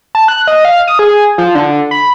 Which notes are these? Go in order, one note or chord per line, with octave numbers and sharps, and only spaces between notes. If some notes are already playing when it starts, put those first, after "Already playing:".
A5
F#6
D#5
F5
D#6
G#4
F3
D3
B5